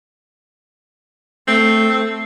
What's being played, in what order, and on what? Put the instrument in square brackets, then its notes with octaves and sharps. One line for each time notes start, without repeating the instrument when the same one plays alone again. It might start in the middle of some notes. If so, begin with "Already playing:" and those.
[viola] A3 [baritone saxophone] C4